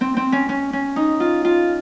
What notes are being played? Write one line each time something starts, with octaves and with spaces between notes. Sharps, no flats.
C4
C4
C#4
C#4
C#4
D#4
F4
F4